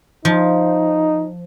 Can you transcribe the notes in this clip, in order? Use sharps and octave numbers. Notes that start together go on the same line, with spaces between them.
F3 D#4